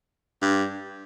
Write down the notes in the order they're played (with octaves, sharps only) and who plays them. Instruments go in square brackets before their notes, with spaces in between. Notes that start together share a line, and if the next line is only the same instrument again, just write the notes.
[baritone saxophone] G2